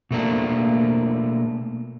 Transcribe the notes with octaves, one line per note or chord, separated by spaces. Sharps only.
B2 A3 A#3 D4